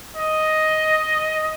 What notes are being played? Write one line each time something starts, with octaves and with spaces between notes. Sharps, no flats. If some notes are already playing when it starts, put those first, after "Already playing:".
D#5